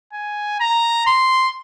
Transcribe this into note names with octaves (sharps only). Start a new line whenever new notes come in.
G#5
A#5
C6